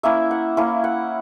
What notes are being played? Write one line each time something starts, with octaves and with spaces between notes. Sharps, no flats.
A#3 C#4 E4 E5
F#5
A#3 C#4 E4
F#5